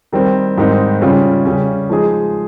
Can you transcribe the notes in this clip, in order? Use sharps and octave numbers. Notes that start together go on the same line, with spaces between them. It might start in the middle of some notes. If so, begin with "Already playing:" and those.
D#3 G3 C4
G#2 D#3 G3 C4 D#4
C#3 G3 C#4 F4
C#3 G3 C#4
F3 G#3 D#4 G#4